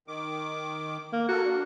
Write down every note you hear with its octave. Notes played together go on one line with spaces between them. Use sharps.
D#3 D6
A#3
F#4 A4 A#4
D4